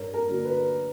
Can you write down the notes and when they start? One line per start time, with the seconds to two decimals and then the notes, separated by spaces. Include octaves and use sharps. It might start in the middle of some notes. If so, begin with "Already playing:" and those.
Already playing: G2 A#4 C#5
0.14 A#4
0.29 D3 F#3 A#3
0.45 B4